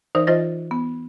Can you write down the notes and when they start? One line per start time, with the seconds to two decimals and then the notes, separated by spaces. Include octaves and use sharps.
0.15 E3 D#4 A#4 C5 D5 D#6
0.27 E3 F4 C5 D#5 A6 A#6
0.71 B3